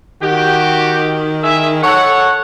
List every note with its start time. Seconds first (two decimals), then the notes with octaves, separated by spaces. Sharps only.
0.22 D#3 F#4 G4
1.43 E4 G#4 E5
1.83 A4 C#5 F#5